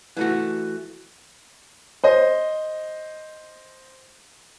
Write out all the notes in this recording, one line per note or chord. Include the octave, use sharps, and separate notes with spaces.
E3 A3 F#4
C5 D#5